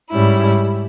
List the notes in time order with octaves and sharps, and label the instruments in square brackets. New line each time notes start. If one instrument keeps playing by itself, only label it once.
[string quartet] G#2 G3 C#4 E4